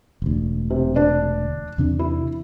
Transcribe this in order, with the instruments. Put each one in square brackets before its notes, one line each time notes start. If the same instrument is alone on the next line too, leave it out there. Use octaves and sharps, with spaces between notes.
[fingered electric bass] E1 D2
[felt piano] C3
D4
[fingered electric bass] E2 C3 D4
[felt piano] E4